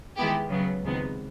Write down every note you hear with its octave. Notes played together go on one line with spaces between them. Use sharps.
D#3 G#3 B3 E4 G4
C#3 F#3 B3
C#2 C3 D#3 G#3 B3